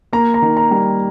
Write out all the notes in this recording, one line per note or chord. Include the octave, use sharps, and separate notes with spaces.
A#3 A#5
A#5
D#3
A#5
G3